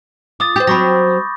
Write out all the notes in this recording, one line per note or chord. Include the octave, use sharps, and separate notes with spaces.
F4 D6 D#6 A6
G4 C5 G6
F#3 C4 B5 C#6 A#6